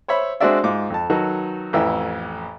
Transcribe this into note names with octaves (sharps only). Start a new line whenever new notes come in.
C5 C#5 E5 B5
G#3 C4 D4 F#4 D5 E5
G#2 F4 D6
F2 A5
D#3 F#3 D#4 F#4 A4 B4
A1 F2 E3 E5